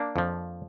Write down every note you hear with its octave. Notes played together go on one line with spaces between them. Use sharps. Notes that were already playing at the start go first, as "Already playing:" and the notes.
Already playing: A#3 D4
F2 F3